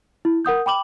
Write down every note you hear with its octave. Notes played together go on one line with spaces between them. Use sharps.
E4
A#4 F#5 D#6 G6
G5 B5 D6 F#7